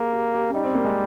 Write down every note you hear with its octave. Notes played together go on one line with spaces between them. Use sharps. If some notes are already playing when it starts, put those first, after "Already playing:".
Already playing: A#3 G4 G#4
G4
G4
C#4
G3 D#4
C4
A#3
G#3